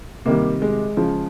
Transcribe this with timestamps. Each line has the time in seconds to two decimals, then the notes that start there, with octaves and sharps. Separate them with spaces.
0.25 C3 D#3 G3 A#3
0.62 G#3
0.97 C#3 F3